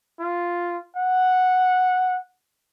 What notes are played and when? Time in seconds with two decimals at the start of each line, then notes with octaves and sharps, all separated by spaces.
0.20 F4
0.96 F#5